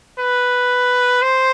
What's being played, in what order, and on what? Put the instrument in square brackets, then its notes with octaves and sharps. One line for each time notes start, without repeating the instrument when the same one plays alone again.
[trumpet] B4
C5